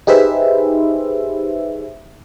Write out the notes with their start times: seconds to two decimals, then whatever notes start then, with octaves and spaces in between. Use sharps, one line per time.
0.07 D#4 G4 G#4 B4 C5 E5